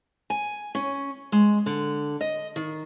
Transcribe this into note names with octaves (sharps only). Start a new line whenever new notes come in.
G#5
C#4
G#3
D3
D#5
D#3